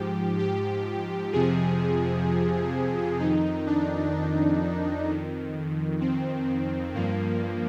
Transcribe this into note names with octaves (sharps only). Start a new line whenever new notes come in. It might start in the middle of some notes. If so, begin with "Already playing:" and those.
Already playing: G#2 F3 G4
G4
F2 C3 F3 G#4
F2 D#3 D#4
D4
D4
F2 D#3
C4
G2 F3 A#3